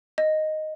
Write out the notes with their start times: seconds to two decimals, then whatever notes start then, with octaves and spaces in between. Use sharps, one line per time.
0.18 D#5